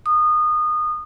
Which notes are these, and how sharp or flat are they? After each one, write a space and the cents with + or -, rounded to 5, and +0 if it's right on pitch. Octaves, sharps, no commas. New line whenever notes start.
D#6 -25